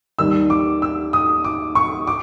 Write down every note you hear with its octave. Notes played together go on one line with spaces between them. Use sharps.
D#2 D#3 G3 E6
D6
E6
D#6
D6
C#6
D6